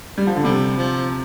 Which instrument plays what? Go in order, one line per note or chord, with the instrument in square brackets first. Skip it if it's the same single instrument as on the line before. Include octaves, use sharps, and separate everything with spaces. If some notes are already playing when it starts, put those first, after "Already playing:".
[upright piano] G3
F3
D3
[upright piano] C3 [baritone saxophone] G3
[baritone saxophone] F3